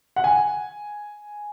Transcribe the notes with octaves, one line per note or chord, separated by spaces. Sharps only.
F#5
G#5